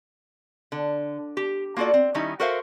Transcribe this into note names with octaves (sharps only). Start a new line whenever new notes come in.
D3
G4
A#3 F4 F#4 A4 D5
C4
D#3 G3 C#4 D#4 E4
F#4 A4 A#4 C5 E5 F5